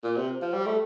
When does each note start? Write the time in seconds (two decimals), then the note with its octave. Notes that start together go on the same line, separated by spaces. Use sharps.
0.04 A#2
0.17 C3
0.42 F3
0.53 G3
0.66 A3